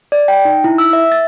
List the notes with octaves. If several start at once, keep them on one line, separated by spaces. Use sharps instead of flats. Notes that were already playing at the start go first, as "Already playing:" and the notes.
D5
G5
D#4
E4
E6
E5
A6